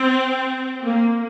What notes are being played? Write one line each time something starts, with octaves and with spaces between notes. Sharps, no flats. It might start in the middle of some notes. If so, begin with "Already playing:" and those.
Already playing: C4
A#3